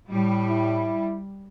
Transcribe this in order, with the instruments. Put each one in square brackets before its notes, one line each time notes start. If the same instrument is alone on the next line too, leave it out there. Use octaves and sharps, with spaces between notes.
[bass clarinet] A2 [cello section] G3
[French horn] E4